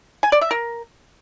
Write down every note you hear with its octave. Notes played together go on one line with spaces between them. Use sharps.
G#5
D5
E5
A#4